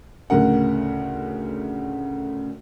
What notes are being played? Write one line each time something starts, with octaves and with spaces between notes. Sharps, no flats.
D2 A2 C#3 A#4 F#5